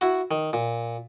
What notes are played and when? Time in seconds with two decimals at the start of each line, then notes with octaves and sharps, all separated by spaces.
0.01 E4 F#4
0.31 D#3
0.53 A#2